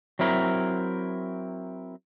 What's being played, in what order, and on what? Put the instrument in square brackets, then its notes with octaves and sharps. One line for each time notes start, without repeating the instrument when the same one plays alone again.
[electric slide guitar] F#3 C4 E4 A#4